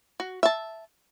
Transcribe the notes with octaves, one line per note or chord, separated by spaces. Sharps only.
F#4
E5 A5